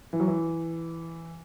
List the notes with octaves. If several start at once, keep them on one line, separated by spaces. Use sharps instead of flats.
E3
F#3
E3